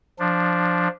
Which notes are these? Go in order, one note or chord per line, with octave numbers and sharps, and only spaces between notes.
F3 D4